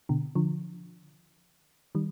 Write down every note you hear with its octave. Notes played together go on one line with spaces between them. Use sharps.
B2 D3
D3 F3
D#3 G3